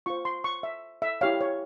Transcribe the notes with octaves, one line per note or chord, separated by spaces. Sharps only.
F4 C5 C#6
C6
C#6
E5
E5
E4 G4 C#5 F5
C#5